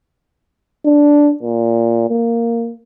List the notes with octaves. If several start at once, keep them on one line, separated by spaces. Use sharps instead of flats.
D4
A#2
A#3